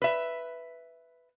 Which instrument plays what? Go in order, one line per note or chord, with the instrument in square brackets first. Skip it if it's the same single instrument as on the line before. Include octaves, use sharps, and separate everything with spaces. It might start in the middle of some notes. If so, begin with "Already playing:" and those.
[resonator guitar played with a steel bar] B4 E5